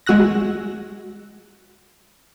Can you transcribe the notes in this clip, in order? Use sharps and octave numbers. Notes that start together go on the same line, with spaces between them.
G#3 F#4 E6 F#6 A#6